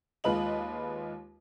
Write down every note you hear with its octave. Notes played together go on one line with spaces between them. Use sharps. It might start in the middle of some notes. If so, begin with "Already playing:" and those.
D#2 G#3 F4 B4 D#5 F#7